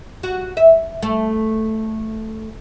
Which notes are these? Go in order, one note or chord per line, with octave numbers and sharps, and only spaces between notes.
F#4
E5
A3